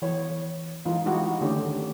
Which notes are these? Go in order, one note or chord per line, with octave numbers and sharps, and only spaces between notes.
E3 C#5
E3 G#3 D#4 F4
G#3 D#4 E4 F#4 G4
D3 D#3 A3 C#4 D4 G4